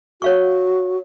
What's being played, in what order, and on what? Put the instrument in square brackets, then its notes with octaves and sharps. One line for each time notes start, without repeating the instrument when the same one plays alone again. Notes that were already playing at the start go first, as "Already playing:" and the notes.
[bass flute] F#4 [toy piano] C#5 F5 C#6